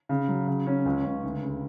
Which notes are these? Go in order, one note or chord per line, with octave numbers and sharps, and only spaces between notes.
C#3
F#3
C#3
C#4
C#2
C#2
D2
C#3